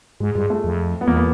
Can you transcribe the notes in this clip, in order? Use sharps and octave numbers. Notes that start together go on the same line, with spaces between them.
G#2 G#3
G2 G#3
A3
F2
B3
E2 A#3
B3